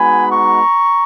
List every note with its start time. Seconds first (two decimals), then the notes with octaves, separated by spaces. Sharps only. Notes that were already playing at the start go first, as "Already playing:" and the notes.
Already playing: G#3 B3 D#4 F#4 G#5 B5
0.31 A#5 C#6